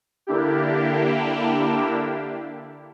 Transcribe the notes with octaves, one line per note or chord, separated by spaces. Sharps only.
D3 A#3 D4 E4 G4